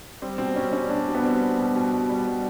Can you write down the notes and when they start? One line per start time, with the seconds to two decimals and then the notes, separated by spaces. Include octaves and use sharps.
0.22 G3 C4
0.38 B2 C4
0.56 G3 C#4
0.73 G3 C#4
0.90 B2 D4
1.08 B2
1.15 B3
1.24 G3 C4
1.42 B2
1.58 B2
1.76 B2
1.93 G3
2.09 G3
2.26 G3